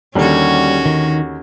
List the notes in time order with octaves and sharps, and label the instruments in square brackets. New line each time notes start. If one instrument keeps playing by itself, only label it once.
[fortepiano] D#2 D3 [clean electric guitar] G3 [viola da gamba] C#4 F#4
[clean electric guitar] D#3